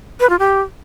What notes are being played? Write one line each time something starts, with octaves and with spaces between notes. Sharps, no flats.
B4
F4
G4